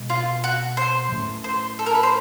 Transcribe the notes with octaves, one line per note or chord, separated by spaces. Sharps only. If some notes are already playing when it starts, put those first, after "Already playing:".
Already playing: B2 G#3 C4
F4
F#4
C5
A2 F#3 A3 C#4
C5
A4
A#4
B4
C5